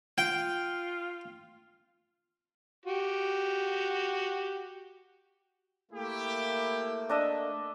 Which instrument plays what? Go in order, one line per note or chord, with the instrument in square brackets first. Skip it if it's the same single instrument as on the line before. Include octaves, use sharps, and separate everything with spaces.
[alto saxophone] F4 [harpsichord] G5
[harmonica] F#4 G4
[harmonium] A3 A#3 [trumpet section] E4 G4
[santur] D4 D#5 E5